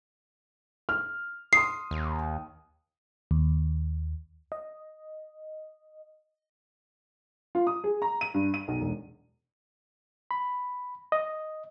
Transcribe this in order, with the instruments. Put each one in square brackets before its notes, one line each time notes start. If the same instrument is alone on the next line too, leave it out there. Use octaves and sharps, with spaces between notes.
[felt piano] F6
[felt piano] C6 D#6 [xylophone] C7
[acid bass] D#2
[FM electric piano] D#2
D#5
[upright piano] F4
D#6
G#4
A#5
D#7
G2
D#7
B1
E1
[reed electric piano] B5
D#5